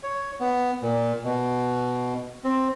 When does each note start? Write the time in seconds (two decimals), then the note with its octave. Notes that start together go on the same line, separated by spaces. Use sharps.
0.03 C#5
0.40 B3
0.82 A#2
1.24 B2
2.44 C4